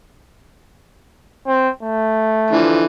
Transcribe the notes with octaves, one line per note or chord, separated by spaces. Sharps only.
C4
A3
D3 E3 F3